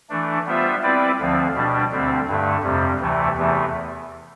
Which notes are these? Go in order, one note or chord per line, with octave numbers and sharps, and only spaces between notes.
E3 A3 D4
G3 B3 F4 C5 E5
G3 C4 E4 B4 D5
D2 D3 F3 C4
B2 G3 D4
D2 D3 G3 C4
G2 D3 A3
F2 C3 G3
D2 C3 E3 A3
E2 C3 E3 A3